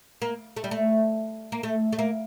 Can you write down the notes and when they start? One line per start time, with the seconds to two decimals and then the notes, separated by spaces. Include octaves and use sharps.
0.22 A#3
0.56 A3
0.64 G3
0.71 A3
1.52 A#3
1.63 A3
1.93 A3
1.99 A#3